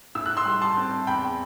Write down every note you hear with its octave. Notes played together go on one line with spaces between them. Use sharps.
A2 E6
F#6
C6 E6
G3
A5 C6
C4
E2 G5 B5